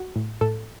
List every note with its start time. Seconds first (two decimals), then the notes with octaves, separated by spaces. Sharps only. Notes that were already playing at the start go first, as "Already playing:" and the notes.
Already playing: F#4
0.16 A2
0.41 A2 A4